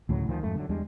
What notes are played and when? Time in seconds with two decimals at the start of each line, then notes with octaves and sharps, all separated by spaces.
0.09 D2 A2 C#3 F#3
0.28 D2 D#3 F3
0.43 F2 G#2 A3
0.55 D3 F#3
0.69 E2 G3 G#3 D4